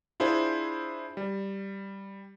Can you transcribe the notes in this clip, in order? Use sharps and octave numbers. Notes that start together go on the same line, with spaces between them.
D4 E4 F4 G#4 C5
G3